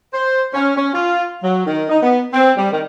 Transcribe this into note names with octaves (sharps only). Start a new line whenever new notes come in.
C5
C#4
C#4
F4
F#3
D#3
D#4
B3
C4
G3
D#3